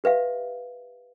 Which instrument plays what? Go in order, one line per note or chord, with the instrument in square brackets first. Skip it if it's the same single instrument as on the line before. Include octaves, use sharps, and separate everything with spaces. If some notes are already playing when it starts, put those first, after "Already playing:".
[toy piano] G4 B4 E5 F5